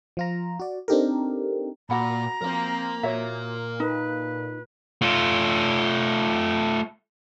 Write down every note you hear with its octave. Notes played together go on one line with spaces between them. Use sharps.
F3 F4 A#5
F#4 D5
C4 D4 D#4 G4 A4 A#4
A#2 F#4 F#5 A#5 B5
F3 A#3 C4 A#4 F5
A#2 F#4 C#5 E5
D#4 B4
A3 F4